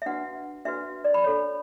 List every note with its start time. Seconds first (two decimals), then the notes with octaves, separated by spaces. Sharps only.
0.02 E5
0.06 D4 F#4 B4 F#5
0.65 D4 F#4 B4 E5
1.04 D5
1.14 B5
1.24 D4 A4 C#5